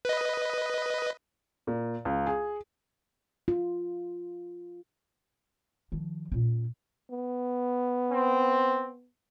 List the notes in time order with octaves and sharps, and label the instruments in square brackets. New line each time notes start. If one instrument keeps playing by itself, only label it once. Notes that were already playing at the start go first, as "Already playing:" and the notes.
[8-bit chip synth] B4 D#5
[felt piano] A#2
C#2
G#4
[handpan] F4
[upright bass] D#3 F3
A#2 C#4
[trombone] B3
[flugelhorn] C4